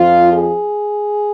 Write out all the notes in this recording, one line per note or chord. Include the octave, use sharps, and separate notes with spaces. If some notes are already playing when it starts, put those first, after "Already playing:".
Already playing: F2 F3 F4
G#4